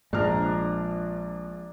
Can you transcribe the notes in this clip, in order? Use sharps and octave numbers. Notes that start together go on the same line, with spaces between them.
A#1 F3 G#3 D4 A#5 F6